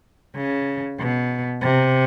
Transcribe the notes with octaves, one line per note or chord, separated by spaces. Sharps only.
C#3
B2
C3